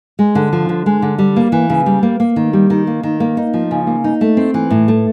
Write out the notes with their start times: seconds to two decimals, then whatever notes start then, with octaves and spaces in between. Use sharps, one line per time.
0.19 G#3
0.35 D3
0.53 F3
0.69 D3
0.86 G#3
1.02 D3
1.19 G3
1.36 A#3
1.52 E3
1.70 C#3
1.86 G3
2.03 A#3
2.20 A#3
2.36 D#3
2.53 G3
2.70 D#3
2.87 A#3
3.03 D#3
3.20 A#3
3.37 D#4
3.54 F3
3.71 C#3
3.87 A#3
4.04 D#4
4.21 A3
4.37 C4
4.54 E3
4.70 A2
4.88 A3